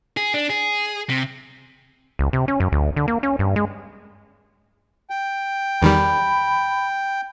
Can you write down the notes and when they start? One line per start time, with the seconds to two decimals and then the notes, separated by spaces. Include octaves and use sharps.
0.17 G#4
0.34 D4
0.50 G#4
1.10 C3
2.19 C#2
2.33 C3
2.48 C#4
2.60 F#2
2.72 D2
2.96 D3
3.08 A#3
3.23 C#4
3.39 G2
3.56 G#3
5.10 G5
5.82 E2 D#3 G3 B5